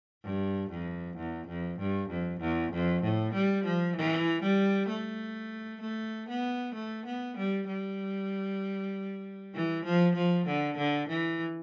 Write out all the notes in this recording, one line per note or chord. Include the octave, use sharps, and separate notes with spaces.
G2
F2
E2
F2
G2
F2
E2
F2
A2
G3
F3
E3
G3
A3
A3
B3
A3
B3
G3
G3
E3
F3
F3
D3
D3
E3